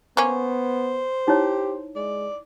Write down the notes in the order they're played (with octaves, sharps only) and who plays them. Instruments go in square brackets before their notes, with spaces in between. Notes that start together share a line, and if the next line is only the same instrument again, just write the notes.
[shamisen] A#3 C#4 [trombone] B3 [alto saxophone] C5
[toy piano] D#4 E4 C#5 [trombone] G4
[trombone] G#3 [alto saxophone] D5